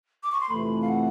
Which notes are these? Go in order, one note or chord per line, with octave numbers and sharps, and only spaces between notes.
D6
C#6
C6
F2 C3 E3 A3 B5
F5
F#5